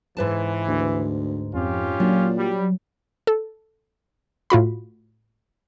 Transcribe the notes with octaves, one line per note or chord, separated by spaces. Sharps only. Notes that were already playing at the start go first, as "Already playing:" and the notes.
C#2 G#2 E3 B4 A5
D2
F2 C#4 F4 G4
A#2 F#3 D4
G3
A4
A2 F4 F#4 B5